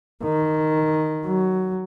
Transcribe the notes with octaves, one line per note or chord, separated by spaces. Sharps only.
D#3
F#3